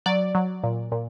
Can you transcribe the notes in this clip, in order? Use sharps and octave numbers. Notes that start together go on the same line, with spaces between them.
F#3 D5
F#3
A#2
A#2